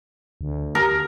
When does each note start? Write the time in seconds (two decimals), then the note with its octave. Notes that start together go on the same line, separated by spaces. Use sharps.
0.41 D2
0.75 A#4